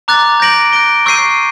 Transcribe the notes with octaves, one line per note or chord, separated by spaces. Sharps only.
A#5 D6 F#6 A6
G6 A#6 D7 F#7
F#6 A#6 D7 G7
C#6 E6 G6 C7 D#7